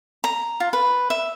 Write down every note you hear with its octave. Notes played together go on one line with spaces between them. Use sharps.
A#5
F4
B4
E5